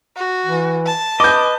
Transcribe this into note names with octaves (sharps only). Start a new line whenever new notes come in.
F#4
E3
A5
B4 D#5 D6 G6